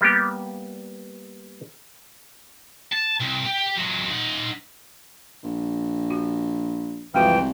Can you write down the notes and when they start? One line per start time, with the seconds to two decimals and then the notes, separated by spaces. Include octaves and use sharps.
0.01 G3 A#3 B3 G4
2.92 A5
3.21 C2
3.46 G4
3.77 F#3 G#3
4.10 D#4 F#5
5.43 A#1
6.11 F#4
7.14 C2 F2 E3 G#3 F#4 G5 G#5